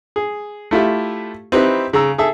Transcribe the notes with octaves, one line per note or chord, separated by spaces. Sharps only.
G#4
A3 E4 F4 G4
C4 D#4 E4 G4 B4
C#3 A#5 E6
G#4 A4 E5